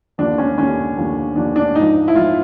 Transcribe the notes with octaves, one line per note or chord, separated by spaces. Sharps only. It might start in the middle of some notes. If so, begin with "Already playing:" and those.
D#2 D3 F3 D4
C#4
D#2 D3 F3 C#4
D#2 D3 F3
D#2 D3 F3 D4
D4
G#2 F3 D#4
E4
G#2 F3 F4